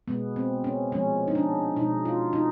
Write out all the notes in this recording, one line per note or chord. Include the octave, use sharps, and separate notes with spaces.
B2 G#3 B3
C4
C#4
A#2 F3 G#3 C#4
D#4
D4
B2 G#3 D#4
F4
D#4